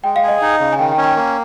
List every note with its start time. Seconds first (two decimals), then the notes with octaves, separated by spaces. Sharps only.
0.04 G#3 G5
0.16 F5
0.23 G#4
0.28 D#5
0.42 D#4
0.60 C#3
0.73 G#5
0.79 D#3 G5
0.92 G5
0.98 C#4
1.04 G5
1.16 A#3